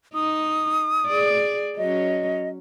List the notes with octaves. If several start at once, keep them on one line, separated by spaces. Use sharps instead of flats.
D#4 D#6
G#4 D5
F#3 C#4 D#5